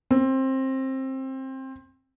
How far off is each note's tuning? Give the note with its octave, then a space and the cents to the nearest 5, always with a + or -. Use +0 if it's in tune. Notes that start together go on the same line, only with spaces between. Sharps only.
C4 +20